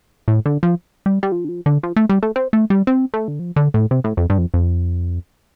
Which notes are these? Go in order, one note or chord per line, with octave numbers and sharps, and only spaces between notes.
A2
D3
F3
G3
G3
F3
D3
F3
D3
F3
A3
G3
A3
C4
A3
G3
C4
A3
D3
F3
D3
A2
C3
A2
F2
G2
F2
F2